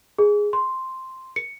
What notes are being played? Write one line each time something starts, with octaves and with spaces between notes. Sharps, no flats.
G#4
C6
C#7